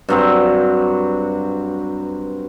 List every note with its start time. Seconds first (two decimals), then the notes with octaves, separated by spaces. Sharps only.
0.09 G2 F#3 C4